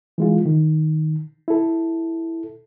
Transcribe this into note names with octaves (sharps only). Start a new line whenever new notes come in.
E3 G#3 F4
D#3
E4 A4